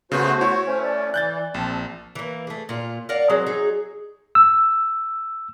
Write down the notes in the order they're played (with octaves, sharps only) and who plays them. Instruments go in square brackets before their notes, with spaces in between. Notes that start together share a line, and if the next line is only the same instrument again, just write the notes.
[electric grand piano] C#3 B3 [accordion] A3 F#4 C5
[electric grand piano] E4 C#5 [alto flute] C#6
[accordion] A3 C#4 [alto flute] C5
[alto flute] D5
[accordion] E3 [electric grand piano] F#6 G6 A6
[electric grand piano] A#1 [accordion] C4 A5
[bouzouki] E3 A#3
A3 G#4
A#2 F4
A#4 D5 F5 F#5
F#3 G#3 C4
F#3 D#4 G#4
[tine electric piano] E6